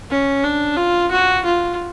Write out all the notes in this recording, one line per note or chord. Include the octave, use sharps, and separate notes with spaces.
C#4
D4
F4
F#4
F4